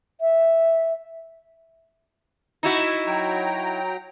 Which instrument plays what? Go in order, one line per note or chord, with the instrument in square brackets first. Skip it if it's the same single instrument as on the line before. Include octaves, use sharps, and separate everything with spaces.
[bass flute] E5
[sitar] D#4 E4 F#4
[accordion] F#3 G5 A#5